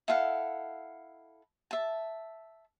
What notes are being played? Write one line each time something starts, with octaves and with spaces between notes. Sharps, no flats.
E4 A4 F5 F#5
E5 A5